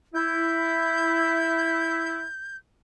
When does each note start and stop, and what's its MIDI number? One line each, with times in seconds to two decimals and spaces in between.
0.15 2.24 64
0.15 2.57 91